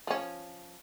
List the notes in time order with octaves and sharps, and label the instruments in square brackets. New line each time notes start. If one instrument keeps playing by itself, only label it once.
[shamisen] F3 C#4